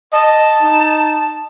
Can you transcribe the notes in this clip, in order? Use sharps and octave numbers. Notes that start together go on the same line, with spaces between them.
D#5 A5
D#4